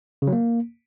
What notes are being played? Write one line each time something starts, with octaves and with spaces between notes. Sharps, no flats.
C#3
F#3
A#3